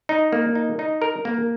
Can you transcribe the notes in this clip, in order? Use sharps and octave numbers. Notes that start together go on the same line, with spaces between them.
D#4
A#3
D#4
D#4
A#4
A#3